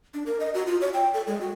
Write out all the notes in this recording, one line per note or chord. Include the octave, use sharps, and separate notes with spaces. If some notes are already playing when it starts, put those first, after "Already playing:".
D4
A#4
D#5
F#4
F4
C#5
G5
A4
G#3
F#4